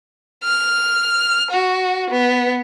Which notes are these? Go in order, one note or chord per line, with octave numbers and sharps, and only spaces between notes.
F6
F#4
B3